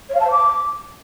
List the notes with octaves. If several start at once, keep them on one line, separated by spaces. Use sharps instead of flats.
C#5
F5
A5
C5
D6